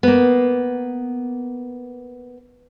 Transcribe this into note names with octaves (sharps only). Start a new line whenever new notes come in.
A#3 B3